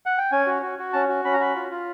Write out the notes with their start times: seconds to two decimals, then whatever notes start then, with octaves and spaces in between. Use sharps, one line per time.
0.06 F#5
0.18 G5
0.32 C#4 G#5
0.47 F#4
0.62 F#4
0.79 F#4
0.93 C#4 A5
1.09 F#4
1.25 C#4 B5
1.33 A#5
1.40 F#4 B5
1.56 F4
1.71 F4